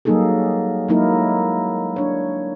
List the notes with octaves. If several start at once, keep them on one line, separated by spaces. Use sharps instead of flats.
F#3 G3 A#3 D#4 G#4 A4
F#3 G#3 A#3 D#4 E4 A#4
D4 C#5